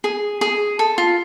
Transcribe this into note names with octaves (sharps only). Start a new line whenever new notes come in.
G#4
G#4
A4
F4